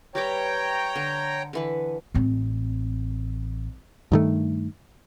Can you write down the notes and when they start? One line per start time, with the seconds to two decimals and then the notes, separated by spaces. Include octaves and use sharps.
0.15 G3 B4 C#5 G5 A#5 D6
0.96 D3
1.53 D3 E3 B4
2.14 A1 C4
4.12 G2 D#3 A3